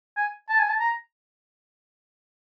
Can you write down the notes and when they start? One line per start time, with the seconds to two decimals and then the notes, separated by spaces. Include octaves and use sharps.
0.17 G#5
0.49 A5
0.59 G#5
0.69 A5
0.80 A#5